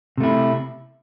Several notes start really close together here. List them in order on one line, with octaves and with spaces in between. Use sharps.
C3 A3 E4